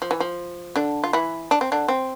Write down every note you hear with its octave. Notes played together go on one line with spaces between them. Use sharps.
F3
E3
F3
D3 D4
F4
E3 E4
D4
C4
D3 D4
C4